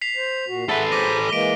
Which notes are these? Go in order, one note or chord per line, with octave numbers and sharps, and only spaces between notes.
B6 C7 F7
C5
A#2 F#4
G#4 A4 B4 E5 F#5
G#4 C5 D6 A#6 D#7
E3 G#3 A#3 D7 D#7 G7